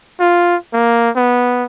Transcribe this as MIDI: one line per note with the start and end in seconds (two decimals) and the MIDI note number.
0.20 0.56 65
0.73 1.10 58
1.16 1.64 59